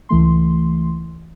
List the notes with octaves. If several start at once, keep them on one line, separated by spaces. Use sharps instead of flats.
C#2 E3 A3 C6